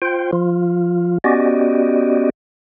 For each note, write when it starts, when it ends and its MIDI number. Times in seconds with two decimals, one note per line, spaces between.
0.02 0.31 65
0.02 0.31 72
0.02 0.31 79
0.33 1.18 53
0.33 1.18 65
1.24 2.30 59
1.24 2.30 61
1.24 2.30 66
1.24 2.30 67
1.24 2.30 74
1.24 2.30 75